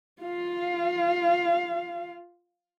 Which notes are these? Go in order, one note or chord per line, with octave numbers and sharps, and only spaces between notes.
F4 F5